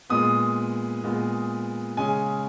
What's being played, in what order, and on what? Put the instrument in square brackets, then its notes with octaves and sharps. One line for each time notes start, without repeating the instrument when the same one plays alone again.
[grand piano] A#2 G#3 B3 D#6
A#2 G#3 B3
C#3 G#3 C#4 G#5